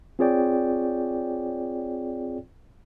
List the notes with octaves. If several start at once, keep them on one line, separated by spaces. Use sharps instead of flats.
C4 F4 G#4 C#5 D5 G5